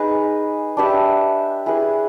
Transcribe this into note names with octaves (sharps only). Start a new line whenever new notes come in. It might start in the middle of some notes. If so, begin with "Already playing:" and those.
Already playing: D#4 G#4 B4
D4 G4 B4 E5
E4 G#4 B4